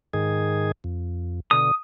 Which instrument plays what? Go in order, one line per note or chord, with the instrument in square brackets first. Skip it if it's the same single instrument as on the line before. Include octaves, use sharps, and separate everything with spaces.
[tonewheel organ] G#2 D#3 G#4
F2
[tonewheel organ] B2 D3 [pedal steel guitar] D#6